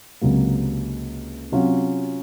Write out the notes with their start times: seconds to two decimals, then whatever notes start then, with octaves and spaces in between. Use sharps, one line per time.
0.21 C#2 C3 F#3 A#3
1.52 C3 F#3 C#4 F4